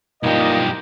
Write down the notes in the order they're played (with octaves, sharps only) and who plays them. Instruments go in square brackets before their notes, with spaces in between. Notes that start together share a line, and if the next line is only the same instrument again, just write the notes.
[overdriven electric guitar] B1 G4 [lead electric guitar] G2 F3 [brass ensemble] A#3 D5 D#5 [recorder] D#4